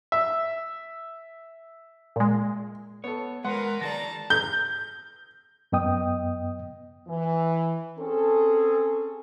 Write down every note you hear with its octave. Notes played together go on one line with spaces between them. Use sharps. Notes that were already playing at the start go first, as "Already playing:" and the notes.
E5
A#2 G#3
B3 A4 C#5
G#3 F#4 A#4 B4 F#5 C6
D#3 G#4 D5 A5 A#5 A#6
G6
F#2 B3 D#5 G5 D#6
E3
C4 C#4 G#4 A4